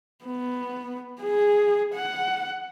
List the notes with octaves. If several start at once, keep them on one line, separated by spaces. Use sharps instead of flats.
B3
G#4
F#5